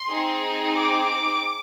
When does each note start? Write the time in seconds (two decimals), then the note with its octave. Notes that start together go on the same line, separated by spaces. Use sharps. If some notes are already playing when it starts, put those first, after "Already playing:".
Already playing: C6
0.09 C4 D#4 G#4
0.74 D6